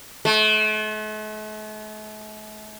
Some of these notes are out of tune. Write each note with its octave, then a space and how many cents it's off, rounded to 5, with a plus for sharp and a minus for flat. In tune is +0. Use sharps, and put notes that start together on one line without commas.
A3 -45